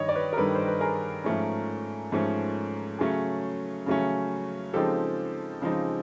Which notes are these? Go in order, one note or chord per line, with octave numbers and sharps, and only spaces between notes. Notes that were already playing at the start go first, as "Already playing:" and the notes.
Already playing: G2 D#3 G3 C#5 D#5
D5
B4 C#5
A#4
G2 D#3 G3 A4 B4
C5
B4
G#4 A#4
G#2 F3 A3 C#4
G#2 F3 A3 C#4
C#3 F#3 A3 C#4 G#4
C#3 F#3 A3 C#4
C#3 F3 G#3 C4 D#4 G4 A4
C#3 F3 G#3 C4 D#4